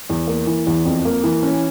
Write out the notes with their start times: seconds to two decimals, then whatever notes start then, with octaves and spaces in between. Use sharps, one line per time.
0.10 E2
0.28 A#3
0.47 E3
0.67 E2
0.85 F2
1.05 A#3
1.24 E3
1.43 C#4